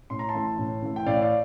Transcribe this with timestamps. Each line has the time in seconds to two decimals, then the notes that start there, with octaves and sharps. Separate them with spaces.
0.10 A2 C6
0.19 A#5
0.28 A5 C6
0.35 E3 A3
0.59 A2
0.82 E3 A3
0.96 G5
1.06 A2 D5 F5
1.22 D5 F5